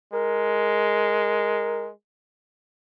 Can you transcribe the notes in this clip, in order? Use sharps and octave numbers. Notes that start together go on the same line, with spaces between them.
G#3 A#4